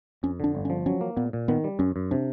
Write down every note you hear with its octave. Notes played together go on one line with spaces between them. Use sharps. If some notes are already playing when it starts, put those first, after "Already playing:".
F2 C#4
D3 D4
G1
C#4
F3
F#3 C#4
A#3
A#2 B3
A#2
D#3 B3
G3
F#2 C#4
F#2
C3 D4